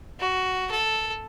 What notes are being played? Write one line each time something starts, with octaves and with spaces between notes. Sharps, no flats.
F#4
A4